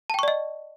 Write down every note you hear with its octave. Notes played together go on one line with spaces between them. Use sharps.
D5 D#5 G5 A5 C#6